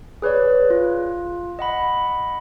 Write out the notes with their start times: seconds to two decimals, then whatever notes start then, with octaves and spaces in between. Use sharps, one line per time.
0.22 G#4 B4 C#5 D5
0.70 F4
1.59 D#5 F#5 B5